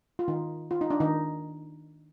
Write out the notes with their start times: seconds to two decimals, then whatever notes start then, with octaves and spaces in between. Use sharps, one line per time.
0.19 F4
0.28 D#3 D#4
0.71 F4
0.81 D#4
0.90 D4
1.00 D#3 D#4